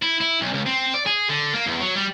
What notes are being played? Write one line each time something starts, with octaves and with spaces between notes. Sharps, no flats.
E4
E4
B1
C#2
C4
D5
G#4
D3
A#3
E2
F#3
G3